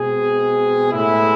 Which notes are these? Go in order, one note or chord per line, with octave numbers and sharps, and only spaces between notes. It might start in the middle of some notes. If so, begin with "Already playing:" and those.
Already playing: B2 G#3 C4 G#4
A2 G#3 B3 E4